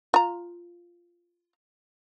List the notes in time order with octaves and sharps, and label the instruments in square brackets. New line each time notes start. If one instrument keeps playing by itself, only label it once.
[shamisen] F4 A#5